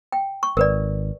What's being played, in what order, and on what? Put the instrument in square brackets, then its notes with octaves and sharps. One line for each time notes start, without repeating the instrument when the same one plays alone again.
[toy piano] G5
C#6
[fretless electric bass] G#1 [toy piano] A#4 B4 D5